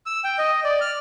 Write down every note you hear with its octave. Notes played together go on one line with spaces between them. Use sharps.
E6
G5
D#5
D5
F6